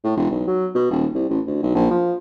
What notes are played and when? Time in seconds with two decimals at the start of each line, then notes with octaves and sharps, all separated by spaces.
0.04 A2
0.17 E1
0.31 B1
0.47 F#3
0.75 B2
0.91 D#1
1.14 C2
1.29 A1
1.47 D2
1.62 B1
1.75 A#1
1.90 F3